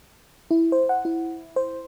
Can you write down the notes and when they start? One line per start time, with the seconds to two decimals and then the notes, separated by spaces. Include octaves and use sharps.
0.51 E4
0.72 C5
0.89 F#5
1.05 E4
1.56 C5